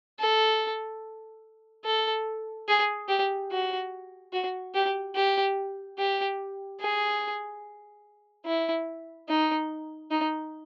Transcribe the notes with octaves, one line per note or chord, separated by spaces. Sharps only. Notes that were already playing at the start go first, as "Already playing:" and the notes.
A4
A4
G#4
G4
F#4
F#4
G4
G4
G4
G#4
E4
D#4
D#4